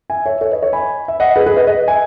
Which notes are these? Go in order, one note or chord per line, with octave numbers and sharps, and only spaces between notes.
E5 G#5
C#5 E5
A4 C#5
B4 D#5
C#5 E5
G#5 B5
E5
D#5 F#5
G#4 B4
G#4 B4
B4 D#5
B4 D#5
E5 G#5